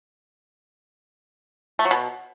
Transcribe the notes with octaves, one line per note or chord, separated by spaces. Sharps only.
A3
F#3
B2